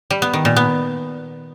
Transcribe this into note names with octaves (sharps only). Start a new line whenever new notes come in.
G3
B3
D#3
A#2
B3